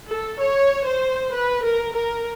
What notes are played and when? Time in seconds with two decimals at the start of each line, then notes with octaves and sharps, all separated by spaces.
0.08 A4
0.39 C#5
0.85 C5
1.32 B4
1.62 A#4
1.93 A#4